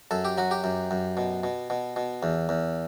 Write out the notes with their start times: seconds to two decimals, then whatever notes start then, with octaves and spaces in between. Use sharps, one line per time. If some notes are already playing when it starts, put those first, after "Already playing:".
0.11 F#2 A4
0.25 G4
0.38 F#3 F#4
0.51 G4
0.64 F#2
0.91 F#2
1.17 B2
1.43 B2
1.70 B2
1.96 B2
2.23 E2
2.49 E2